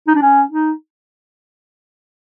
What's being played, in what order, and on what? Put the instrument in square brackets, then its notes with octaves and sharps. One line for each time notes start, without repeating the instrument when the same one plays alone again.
[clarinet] D#4
D4
C#4
D#4